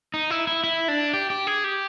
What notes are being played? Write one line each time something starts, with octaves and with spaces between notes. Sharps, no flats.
D#4
E4
E4
E4
D4
G4
G4
G#4
G4